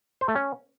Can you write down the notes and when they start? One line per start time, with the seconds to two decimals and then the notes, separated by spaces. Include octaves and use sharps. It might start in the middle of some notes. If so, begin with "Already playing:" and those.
0.21 C5
0.28 A3
0.35 C#4